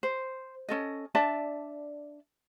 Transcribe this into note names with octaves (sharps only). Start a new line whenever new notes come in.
C5
C#4 A4 D#5
D4 D5 E5 A5